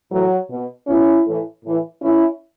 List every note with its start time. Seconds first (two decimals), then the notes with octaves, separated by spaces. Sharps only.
0.11 A2 E3 F#3
0.50 B2
0.87 B2 C#4 E4
1.25 A2 E3
1.64 A2 E3
2.02 A2 E3 C#4 E4